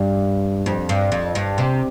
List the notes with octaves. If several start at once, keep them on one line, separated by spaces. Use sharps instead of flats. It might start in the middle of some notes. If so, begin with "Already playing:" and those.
Already playing: G2
F2
G2
F2
G2
C3